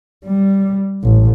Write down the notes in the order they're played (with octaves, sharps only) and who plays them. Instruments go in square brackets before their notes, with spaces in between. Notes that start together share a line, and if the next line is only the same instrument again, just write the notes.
[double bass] G3
A1